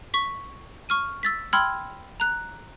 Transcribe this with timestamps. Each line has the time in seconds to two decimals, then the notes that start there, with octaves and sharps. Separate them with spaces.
0.14 C#6 B6
0.89 C#6 F6 D#7
1.23 E6 A6 B6
1.53 G5 B5 C6 E6 F6 G#6
2.20 A#5 F#6